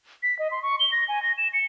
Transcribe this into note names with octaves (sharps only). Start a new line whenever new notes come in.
B6
D#5
C6
C#6
G7
A#6
G#5
A#6
E7
C#7